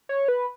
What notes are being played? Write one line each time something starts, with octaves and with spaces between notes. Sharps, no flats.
C#5
B4